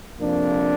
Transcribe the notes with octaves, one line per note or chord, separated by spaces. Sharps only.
F2 C3 F3 A#3 D4